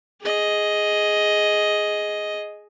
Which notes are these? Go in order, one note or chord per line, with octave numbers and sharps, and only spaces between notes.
G#4 D#5